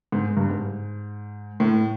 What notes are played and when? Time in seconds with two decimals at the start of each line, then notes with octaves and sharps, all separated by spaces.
0.12 G#2
0.37 G2
0.49 G#2
1.60 A2